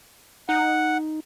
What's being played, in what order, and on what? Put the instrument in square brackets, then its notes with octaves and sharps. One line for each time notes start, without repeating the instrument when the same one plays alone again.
[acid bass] D#4 [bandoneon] F#5